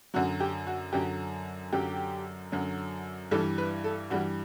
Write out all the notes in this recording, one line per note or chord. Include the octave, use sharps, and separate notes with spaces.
F#2 D3 F#3 F#4
G4
F#4
F#2 D3 F#3 G4
F#2 D3 F#3 G4
F#2 D3 F#3
G2 E3 G3 A4
B4
A4
G2 E3 G3 F#4